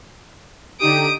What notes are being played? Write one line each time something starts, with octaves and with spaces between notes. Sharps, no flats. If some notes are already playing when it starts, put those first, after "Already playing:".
D3 D#4 G4 D#6 D7